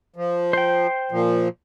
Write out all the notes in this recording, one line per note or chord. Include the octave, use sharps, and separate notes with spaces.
F3
C5 G5
A#2 F3